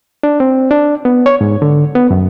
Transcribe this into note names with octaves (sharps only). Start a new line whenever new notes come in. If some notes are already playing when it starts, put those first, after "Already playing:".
D4
C4
D4
B3
C#5
G#2
D3
B3
F#2